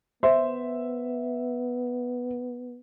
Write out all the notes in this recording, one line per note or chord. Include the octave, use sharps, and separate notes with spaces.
B3 C5 E5